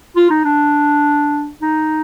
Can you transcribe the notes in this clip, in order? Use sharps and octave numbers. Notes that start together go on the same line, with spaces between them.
F4
D#4
D4
D#4